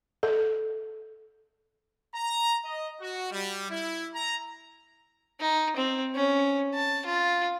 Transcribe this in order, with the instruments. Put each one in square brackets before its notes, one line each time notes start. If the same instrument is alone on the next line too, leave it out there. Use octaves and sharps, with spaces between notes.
[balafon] A4
[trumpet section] A#5
D#5
F#4
G3
E4
A#5
[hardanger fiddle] D#4
C4
C#4
A5
F4